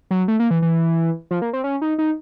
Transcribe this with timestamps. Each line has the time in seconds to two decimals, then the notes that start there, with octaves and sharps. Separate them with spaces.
0.11 F#3
0.28 A3
0.40 A#3
0.51 E3
0.62 E3
1.31 F3
1.42 A#3
1.53 C4
1.64 C#4
1.82 D#4
1.98 D#4